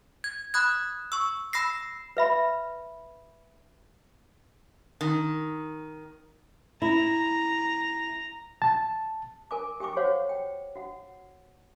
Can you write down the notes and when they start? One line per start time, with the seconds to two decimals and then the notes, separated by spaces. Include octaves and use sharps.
0.24 G#6
0.54 B5 D#6 F#6 G#6
1.12 C#6 E6
1.53 B5 E6 A#6 C7
2.17 B4 E5 B5
5.01 D#3
6.82 E4 A#5
8.62 A5
9.51 A#4 G#5 D6
9.80 G4 G5 G#5 C#6 D6
9.97 F#4 C5 C#5 F5 F#5
10.29 G5
10.76 F#4 F#5